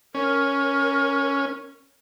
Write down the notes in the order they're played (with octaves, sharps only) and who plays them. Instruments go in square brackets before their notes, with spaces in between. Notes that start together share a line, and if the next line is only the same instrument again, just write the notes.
[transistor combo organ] C#4 [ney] A#4